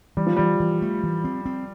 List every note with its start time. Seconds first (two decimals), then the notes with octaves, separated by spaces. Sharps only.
0.17 E3 G3
0.27 F3
0.36 E3 G3
0.60 E3
0.82 A3
1.03 E3
1.24 C4
1.46 C4